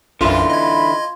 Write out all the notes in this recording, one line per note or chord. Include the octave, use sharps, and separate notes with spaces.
B1 F#2 D3 E3 E4 F4
D#5 B5 G#6